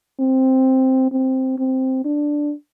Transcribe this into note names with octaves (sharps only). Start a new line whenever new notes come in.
C4
C4
C4
D4